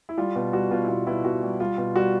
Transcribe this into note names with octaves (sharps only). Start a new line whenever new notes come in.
E4
G3 F4
B2
G3 F#4
B2 F4
E4
B2 F4
B2 E4
B2 F#4
G3
G3 F4
B2
G3 F#4